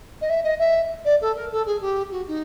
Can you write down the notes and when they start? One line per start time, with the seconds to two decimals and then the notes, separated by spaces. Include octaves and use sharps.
0.21 D#5
0.29 E5
0.43 D#5
0.58 E5
1.04 D5
1.21 A4
1.35 A#4
1.51 A4
1.66 G#4
1.81 G4
2.11 F#4
2.27 D#4